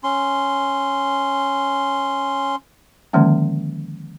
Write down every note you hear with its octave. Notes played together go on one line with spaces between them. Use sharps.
C#4 C6
D3 D#3 F3 G#3 A#3 C#4